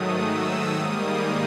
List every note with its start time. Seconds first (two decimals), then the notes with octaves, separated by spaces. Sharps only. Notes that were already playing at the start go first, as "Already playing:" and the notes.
Already playing: G#2 D#3 F#3 A3 D#6
0.23 E6
0.76 G#2 D#3 G3 A#3 D#6